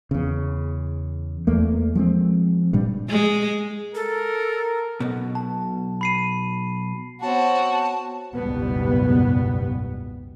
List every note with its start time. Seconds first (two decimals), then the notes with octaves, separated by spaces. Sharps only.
0.11 E2 C#3
1.47 E2 A3 A#3
1.95 F3 G#3 C4
2.73 G2 A#2 G3
3.09 G#3
3.95 A4 A#4
5.00 B1 B2
5.35 A5
6.01 B5 C7 D#7
7.21 B3 C4 F#4 C#5 F#5 A5
8.34 F#1 C#2 G#2 B2 G3 B3